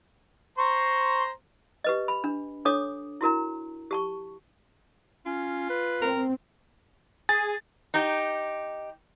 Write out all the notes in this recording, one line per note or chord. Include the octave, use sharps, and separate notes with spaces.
C5 A#5 C6 C#6
G4 B4 D#5
B5
D4
D4 A4 C#5 D6 D#6
E4 F#4 A#4 A#5
G4 A5 C#6
C#4 F4
B4
C4 A#4
G#4 A6
D#4 G4